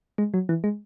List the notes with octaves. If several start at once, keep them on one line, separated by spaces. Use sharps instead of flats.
G#3
F#3
E3
G#3